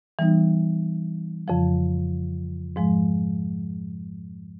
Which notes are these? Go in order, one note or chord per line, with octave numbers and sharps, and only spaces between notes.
E3 G3 B3 D#4
F2 C#3 F3
G#2 F3 G#3